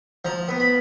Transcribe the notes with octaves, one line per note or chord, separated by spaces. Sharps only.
F3 A#5
B3
B5